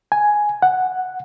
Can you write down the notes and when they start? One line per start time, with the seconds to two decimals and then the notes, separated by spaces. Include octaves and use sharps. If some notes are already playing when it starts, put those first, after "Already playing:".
0.12 G#5
0.62 F#5